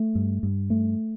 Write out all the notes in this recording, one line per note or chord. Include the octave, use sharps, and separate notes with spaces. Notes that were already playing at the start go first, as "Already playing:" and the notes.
Already playing: A3
G2
G2
A3